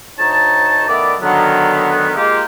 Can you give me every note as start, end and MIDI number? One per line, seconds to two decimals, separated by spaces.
0.19 0.83 38
0.19 0.83 63
0.19 0.83 73
0.19 0.83 81
0.88 1.15 51
0.88 1.15 57
0.88 1.15 59
0.88 1.15 64
0.88 1.15 74
1.22 2.12 50
1.22 2.12 51
1.22 2.12 54
1.22 2.12 59
2.16 2.42 56
2.16 2.42 58
2.16 2.42 65
2.16 2.42 67